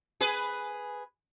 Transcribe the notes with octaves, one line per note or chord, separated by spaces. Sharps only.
G#4 B4